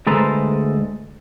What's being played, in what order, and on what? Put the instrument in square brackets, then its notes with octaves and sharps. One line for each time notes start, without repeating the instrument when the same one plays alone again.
[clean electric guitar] D2 G#3 A4 B4 C5 A#5